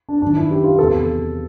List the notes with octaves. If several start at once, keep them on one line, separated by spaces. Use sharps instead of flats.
D4
F#2 D#3 D4
E4
G4
F4
E2 C3 E3 A4